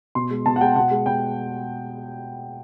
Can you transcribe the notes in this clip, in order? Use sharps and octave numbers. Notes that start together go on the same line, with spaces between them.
B2 C6
G#3
B2 A5
F#5
G#3 G5
B2 F#5
G#3
B2 G5